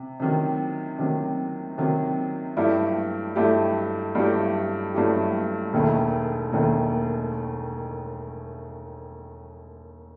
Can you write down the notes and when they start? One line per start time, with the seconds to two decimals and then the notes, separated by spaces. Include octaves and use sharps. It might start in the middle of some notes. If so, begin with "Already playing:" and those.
Already playing: C3
0.20 C3 D#3 F#3
0.99 C3 D#3 F#3
1.78 C3 D#3 F#3
2.57 G2 F#3 A3 E4 G4
3.36 G2 F#3 A3 E4 G4
4.15 G2 F#3 A3 E4 G4
4.94 G2 F#3 A3 E4 G4
5.73 E1 D#2 D#3 A3
6.52 E1 D#2 D#3 A3